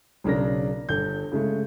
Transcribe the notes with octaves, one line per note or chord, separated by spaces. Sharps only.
B1 C#3 D4 A#4 A#6
G1 A4 G6
C#3 G#3 A3